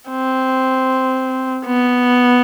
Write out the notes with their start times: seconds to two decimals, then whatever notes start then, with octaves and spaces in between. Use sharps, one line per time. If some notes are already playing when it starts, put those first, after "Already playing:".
0.10 C4
1.66 B3